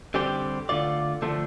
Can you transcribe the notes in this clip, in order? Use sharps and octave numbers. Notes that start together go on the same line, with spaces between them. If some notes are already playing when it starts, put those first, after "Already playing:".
D3 G3 C4 G4
D3 A3 F4 D5
D3 F3 A3 D4